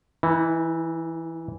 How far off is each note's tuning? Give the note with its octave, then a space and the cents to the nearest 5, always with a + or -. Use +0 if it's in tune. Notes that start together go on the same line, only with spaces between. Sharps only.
E3 -5 D#4 +40